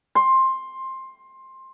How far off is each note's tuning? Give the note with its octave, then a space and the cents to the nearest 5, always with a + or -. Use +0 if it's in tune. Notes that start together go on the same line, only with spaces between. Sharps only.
C6 +15